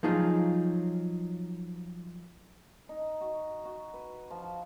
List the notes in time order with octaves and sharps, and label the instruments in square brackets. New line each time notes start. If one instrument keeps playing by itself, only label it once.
[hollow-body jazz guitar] F3 F#3 D#4 F4 G#4
[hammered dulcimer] D#4
F#4
F#4
B4
F3